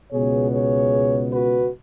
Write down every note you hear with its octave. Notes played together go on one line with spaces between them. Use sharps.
C#2 B2 B3 G#4 C#5
G#4 C#5
F#4 B4